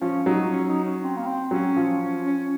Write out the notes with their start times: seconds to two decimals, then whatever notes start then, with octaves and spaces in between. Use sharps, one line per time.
0.01 F3 C#4
0.26 F#3 D#4
0.51 C#4
0.68 D#4
0.84 C#4
1.02 C4
1.17 A#3
1.26 C4
1.51 F#3 C#4
1.76 F3
2.01 C#4
2.26 C#4